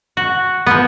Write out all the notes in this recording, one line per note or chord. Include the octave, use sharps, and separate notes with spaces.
F#4
F3 B3